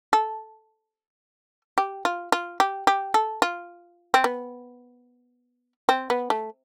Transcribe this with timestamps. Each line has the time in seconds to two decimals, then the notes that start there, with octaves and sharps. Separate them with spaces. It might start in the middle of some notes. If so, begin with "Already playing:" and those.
0.13 A4
1.78 G4
2.05 F4
2.32 F4
2.60 G4
2.87 G4
3.14 A4
3.42 F4
4.14 C4
4.24 B3
5.89 C4
6.10 B3
6.30 A3